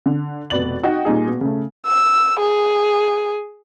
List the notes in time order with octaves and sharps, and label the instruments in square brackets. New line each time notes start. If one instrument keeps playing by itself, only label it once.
[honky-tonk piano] D3
F1 B2 B4 D5 A6 F#7
D#4 F#4 D#5 G5
A#2 G3 D#4 G#4
B2
C#3 A3
[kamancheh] E6
G#4